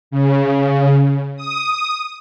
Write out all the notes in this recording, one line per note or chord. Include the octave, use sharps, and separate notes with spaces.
C#3
D#6